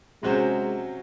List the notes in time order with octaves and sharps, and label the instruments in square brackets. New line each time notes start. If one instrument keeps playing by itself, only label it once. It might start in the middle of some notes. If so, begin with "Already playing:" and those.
[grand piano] C3 F#3 C#4 F#4 C5 [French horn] G#3